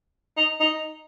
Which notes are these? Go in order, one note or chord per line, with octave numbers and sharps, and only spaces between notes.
D#4
D#4